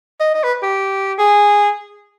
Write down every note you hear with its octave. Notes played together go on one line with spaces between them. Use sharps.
D#5
D#5
B4
G4
G#4